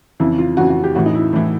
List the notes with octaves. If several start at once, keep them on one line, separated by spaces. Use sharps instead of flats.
F2 C#3 E3 E4
F4
F2 C#3 E3 F#4
F#4
G4
A2 E3 F#4
D#4
E4
A2 E3